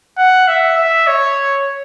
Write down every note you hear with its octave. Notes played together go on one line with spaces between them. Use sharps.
F#5
E5
E5
C#5